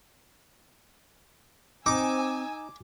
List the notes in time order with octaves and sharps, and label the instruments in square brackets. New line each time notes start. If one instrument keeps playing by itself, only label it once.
[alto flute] C4 [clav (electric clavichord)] D#4 [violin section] G#5 E6 [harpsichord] D6